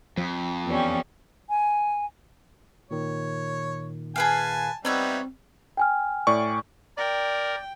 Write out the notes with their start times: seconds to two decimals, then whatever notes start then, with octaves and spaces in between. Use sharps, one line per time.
0.17 F2 F3
0.65 E2 G3 C#4
1.49 G#5
2.91 A#2 D#3 C#5
4.16 G#4 B4 F5 G#5 A5
4.85 G3 B3 C4 D#4 B4 C#5 E5
5.77 G5 G#5 F6
6.27 A2 D5 C#6
6.98 A#4 D5 G5